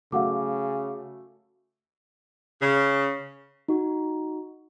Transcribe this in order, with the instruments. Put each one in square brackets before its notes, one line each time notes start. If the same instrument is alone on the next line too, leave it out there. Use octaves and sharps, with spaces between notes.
[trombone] C#3 [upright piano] F#3 A3 [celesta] F5 F#5 D6
[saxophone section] C#3
[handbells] D#4 F#4